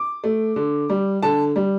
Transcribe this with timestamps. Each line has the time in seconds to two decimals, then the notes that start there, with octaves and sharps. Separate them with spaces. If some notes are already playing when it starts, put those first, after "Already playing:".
Already playing: D6
0.24 A3
0.56 D3
0.90 G3
1.23 D3 A5
1.56 G3